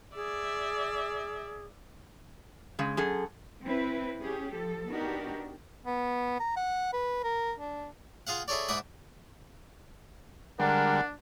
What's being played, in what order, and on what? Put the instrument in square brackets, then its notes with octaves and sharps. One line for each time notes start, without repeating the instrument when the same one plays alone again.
[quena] G#4 [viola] D5 E5
[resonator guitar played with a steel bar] C#3 G#3
F#2 G#4 A4
[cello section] C4 E4 B4
C#4 G4 G#4
F3 A4
B3 D4 D#4 F#4 G4 A#4
[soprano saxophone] B3
A#5
F#5
B4
A#4
D4
[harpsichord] F4 G#4 F5 F#5
E4 G#4 A4 C#5 D5
G#2 E4 D5 E5 F#5 D#6
[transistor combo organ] D3 G3 G#3 [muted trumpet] D4 [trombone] A#4 [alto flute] F#5